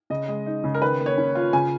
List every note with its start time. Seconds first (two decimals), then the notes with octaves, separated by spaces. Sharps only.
0.10 C#3 D#5
0.28 G#3
0.46 D#4
0.64 C#3
0.75 A#4
0.82 D#3 B4
1.00 A#3
1.06 C#5
1.18 C#4
1.35 F4
1.53 C#3 G#5